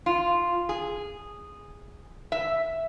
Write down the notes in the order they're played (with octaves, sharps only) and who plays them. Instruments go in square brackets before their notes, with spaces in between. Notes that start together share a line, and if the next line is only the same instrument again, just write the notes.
[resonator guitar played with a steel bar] F4
G#4
E5